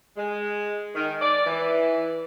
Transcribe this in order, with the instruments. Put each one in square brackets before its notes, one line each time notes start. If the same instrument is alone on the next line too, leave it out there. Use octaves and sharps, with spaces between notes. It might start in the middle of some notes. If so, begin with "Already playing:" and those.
[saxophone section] G#3
D#3
D5
E3